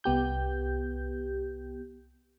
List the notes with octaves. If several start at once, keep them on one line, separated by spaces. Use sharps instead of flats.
C2 B3 G4 G6